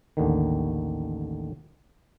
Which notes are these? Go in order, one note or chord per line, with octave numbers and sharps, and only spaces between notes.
A1 D#2 D3 D#3